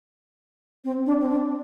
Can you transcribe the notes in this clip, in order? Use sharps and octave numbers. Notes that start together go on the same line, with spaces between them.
C4
D4
C4
D4